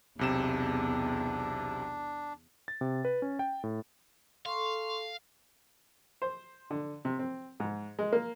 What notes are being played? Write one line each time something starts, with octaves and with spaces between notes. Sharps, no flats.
B1 E2 C3 D4 E7
A6
C3
B4
C#4
G5
A2
A4 F5 C6 C#6
C5
D3
C3
C4
G#2
G#3
A#3